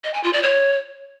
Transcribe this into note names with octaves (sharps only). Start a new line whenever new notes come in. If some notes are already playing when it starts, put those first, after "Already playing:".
D#5
G#5
F4
D5
C#5